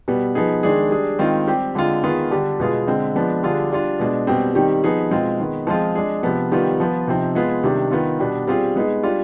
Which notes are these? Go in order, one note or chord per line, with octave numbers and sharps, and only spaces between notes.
B2 G3 B3
F3 B3 D#4 G#4
D#3 G#3 D4 G#4
G3 D4 G#4
D#3 G#3 C4 F4
G3 C4 G4
D3 G#3 C4 F4
D#3 B3 F4 G#4
D3 G3 D4 G4
B2 G#3 B3 F4 G#4
D3 G#3 C4
F3 G#3 B3 D4
D3 G3 D4 F4 G#4
G3 D4 F4
B2 G#3 D4
B2 G3 C4 G4
D#3 G3 C4 D#4 G4
F3 B3 D#4 G#4
B2 G#3 C4 F4
D#3 G#3 B3
F3 G#3 C4 F4 G#4
G#3 D4 G#4
C3 F3 B3
D#3 G3 B3 F4
F3 B3 F4
C3 F3 C4 D#4
G#3 B3 F4 G#4
C3 D#3 G3 D4
D#3 B3 F4
B2 G3 B3 D4
G3 C4 F4 G#4
G#3 B3 D#4 G#4
G3 D4 F4